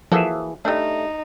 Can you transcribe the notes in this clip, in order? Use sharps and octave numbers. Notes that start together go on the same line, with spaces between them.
E3 F3 A#3 F#4 G#4 A4 E5
G3 A3 D4 D#4